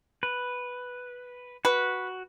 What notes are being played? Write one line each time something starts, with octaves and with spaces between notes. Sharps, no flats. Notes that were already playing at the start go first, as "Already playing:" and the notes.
B4
F#4 B4